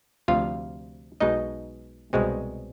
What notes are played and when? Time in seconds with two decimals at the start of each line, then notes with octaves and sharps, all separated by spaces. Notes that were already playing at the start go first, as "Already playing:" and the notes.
0.28 D2 C3 F3 F4 F5
1.20 B1 B2 G#3 D#4 D#5
2.13 C2 B2 G#3 C4